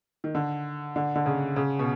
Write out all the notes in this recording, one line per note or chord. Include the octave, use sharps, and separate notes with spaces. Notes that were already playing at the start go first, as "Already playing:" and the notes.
D#3
D3
D3
D3
C#3
C#3
B2